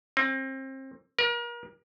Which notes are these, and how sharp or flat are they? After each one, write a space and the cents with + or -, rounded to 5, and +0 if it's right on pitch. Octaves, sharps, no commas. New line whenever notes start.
C4 +30
A#4 +35